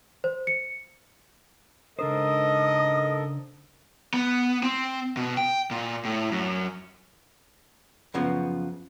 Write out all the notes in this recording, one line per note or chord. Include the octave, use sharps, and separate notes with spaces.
C5
C#7
G#2 C#3 D4 A4 A#4 C5 D#5 D#6
B3
C4
B2
G5
A#2
A2
F#2
F#2 C#3 F3 B3